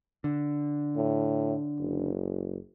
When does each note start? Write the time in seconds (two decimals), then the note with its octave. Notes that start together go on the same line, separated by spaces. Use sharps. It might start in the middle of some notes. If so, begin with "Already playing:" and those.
0.24 D3
0.96 A2
1.78 F#1